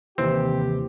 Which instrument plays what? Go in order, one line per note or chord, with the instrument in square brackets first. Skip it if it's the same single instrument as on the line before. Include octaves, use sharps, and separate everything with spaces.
[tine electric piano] D#2 C3 E3 [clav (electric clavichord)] C4 [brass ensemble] G4